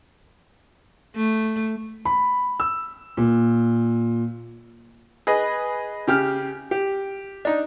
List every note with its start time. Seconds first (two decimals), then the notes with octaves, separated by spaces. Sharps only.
1.16 A3
2.05 B5
2.60 E6
3.17 A#2
5.27 G#4 B4 D#5
6.08 C#3 G4 F6
6.71 G4
7.45 D4 D#4